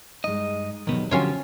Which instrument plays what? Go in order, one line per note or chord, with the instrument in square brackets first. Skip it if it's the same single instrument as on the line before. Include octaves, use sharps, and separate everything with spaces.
[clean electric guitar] G2 D#5 [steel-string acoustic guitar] G#3 D#4
[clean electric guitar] B1 B3 [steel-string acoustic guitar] E2 C3 F#3 [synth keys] D#3
[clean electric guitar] D3 G4 [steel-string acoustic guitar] F3 [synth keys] F#3 [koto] C#4 F4 C#5